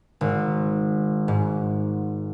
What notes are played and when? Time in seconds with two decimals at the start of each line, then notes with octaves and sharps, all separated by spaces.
0.21 G#1
1.28 G#2